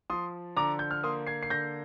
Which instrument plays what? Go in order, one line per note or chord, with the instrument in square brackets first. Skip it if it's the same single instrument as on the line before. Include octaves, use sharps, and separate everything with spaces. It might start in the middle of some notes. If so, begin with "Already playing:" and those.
[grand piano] F3 C6 D#6
D3 A#5 D6
G6
F6
A#3 C6 D#6
G#6 C7
C7
D3 G6 A#6